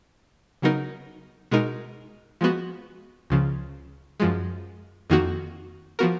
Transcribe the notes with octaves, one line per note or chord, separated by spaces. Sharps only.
C#3 F#3 B3 D#4 A#4
B2 G#3 D#4 A#4
F3 G#3 B3 F#4
C#2 C#3 F3
F#2 F3 G#3
F2 D#3 A#3 D#4 F#4
F3 B3 F#4 A#4